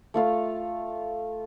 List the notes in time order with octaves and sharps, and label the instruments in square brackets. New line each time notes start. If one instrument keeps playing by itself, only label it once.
[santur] A3 F4 F5